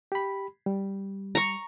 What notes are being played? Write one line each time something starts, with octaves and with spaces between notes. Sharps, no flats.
G4 B5
G3
A#5 C#6